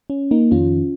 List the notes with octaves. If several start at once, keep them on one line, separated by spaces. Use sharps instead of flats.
C#4
A#3 D#4
F2 D#3 C#4 F4